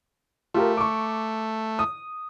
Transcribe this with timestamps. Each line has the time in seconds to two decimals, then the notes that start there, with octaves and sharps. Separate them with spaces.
0.54 A3 F4 G4 A#4
0.77 C#6 D6
1.79 D#6